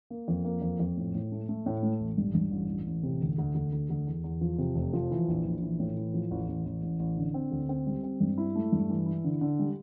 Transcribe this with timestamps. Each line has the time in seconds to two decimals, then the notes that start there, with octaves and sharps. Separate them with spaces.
0.10 A#3
0.28 F2
0.45 A#3
0.62 F2
0.80 F2
0.97 A2
1.15 A2
1.32 A3
1.49 A3
1.66 A2
1.83 A3
2.00 A1
2.18 G2
2.34 G2
2.51 A1
2.69 A1
2.87 A1
3.03 C3
3.21 D2
3.38 D2
3.55 D2
3.73 D2
3.90 D2
4.06 E2
4.24 E2
4.41 F3
4.58 C3
4.75 F1
4.93 F3
5.11 E3
5.28 A#1
5.45 A#1
5.62 E3
5.80 A2
5.97 E3
6.14 F3
6.31 A1
6.48 A1
6.66 A1
6.83 A1
7.00 A1
7.17 D3
7.34 C4
7.51 D2
7.69 C4
7.87 G3
8.03 C4
8.20 G2
8.38 E4
8.55 A3
8.72 G2
8.90 E3
9.06 E4
9.24 D3
9.41 D3
9.59 G3